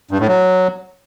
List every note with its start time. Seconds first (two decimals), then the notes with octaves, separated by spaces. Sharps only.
0.11 G2
0.20 A2
0.28 F#3